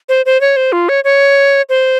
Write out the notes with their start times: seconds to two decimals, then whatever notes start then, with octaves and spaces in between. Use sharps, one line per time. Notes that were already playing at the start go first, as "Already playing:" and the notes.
0.09 C5
0.26 C5
0.41 C#5
0.56 C5
0.72 F4
0.89 C#5
1.04 C#5
1.69 C5